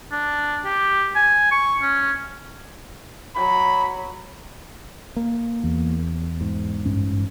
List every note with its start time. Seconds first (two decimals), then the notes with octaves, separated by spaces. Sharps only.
0.12 D4
0.65 G4
1.16 G#5
1.52 C#6
1.82 C#4
3.35 F#3 B5
5.16 A#3
5.64 E2
6.41 G#2
6.86 A1 G2 C#4